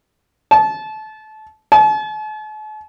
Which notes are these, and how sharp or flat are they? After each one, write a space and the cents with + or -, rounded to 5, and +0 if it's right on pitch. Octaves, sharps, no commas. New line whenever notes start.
A5 -25
A5 -45